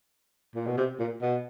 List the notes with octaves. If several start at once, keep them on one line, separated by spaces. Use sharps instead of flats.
A#2
B2
C3
A#2
B2